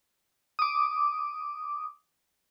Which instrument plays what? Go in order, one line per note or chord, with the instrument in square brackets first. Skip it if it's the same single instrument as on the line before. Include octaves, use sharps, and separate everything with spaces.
[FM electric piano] D6 D#6